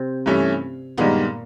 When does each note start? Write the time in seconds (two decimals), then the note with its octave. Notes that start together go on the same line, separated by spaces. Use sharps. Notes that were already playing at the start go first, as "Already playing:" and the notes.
Already playing: C3 C4
0.26 G2 E3 A3 C#4 E4
0.97 G2 A#2 D#3 G#3 A#3 B3